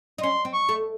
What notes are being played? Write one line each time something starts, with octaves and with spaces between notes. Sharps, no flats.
D#4
C#4 C6
C4
C#6
A3